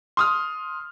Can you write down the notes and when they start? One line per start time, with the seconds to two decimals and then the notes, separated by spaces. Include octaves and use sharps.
0.17 C6 D#6 F6